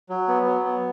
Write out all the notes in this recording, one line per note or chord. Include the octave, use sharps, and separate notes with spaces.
F#3
B3
F#3
B3